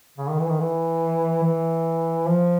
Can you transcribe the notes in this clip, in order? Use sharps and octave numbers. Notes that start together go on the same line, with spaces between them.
C#3
D#3
E3
D#3
E3
E3
F3